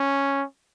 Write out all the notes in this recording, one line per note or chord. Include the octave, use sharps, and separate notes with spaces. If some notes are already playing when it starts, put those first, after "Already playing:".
Already playing: C#4